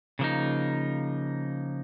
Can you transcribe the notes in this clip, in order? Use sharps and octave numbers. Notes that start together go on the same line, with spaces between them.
C#3 F3 A#3 D#4